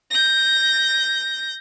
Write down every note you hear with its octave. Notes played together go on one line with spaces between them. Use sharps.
G6 A#6